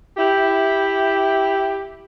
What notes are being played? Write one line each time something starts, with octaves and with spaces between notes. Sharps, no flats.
E4 G4